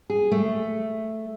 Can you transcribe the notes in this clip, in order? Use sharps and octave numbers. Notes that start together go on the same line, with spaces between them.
G#4
A3